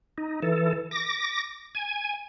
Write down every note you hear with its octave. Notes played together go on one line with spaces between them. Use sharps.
D#4
E3 A4
D6 A#6
G#5